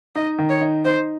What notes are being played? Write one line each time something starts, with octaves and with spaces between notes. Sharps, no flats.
D#4 D#5
D#3
C#5
D#4
D#4 C5